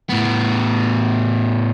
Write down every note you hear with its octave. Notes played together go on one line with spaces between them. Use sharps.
A2 B3